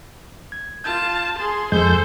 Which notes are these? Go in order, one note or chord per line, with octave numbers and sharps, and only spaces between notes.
G#6
F4 A5 G6
G#4 C6
F2 G#3 A4 C5 G6